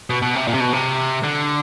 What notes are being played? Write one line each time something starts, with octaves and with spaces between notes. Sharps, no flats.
B2
B2
C3
A#2
C3
B2
C3
D3